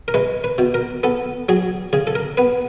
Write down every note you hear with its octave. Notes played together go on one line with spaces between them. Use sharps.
A#4
G#3 B4
B4
B2
A#4
B3 A4
F#3 G#4
C#3 G#4
A4
A#4
B3 B4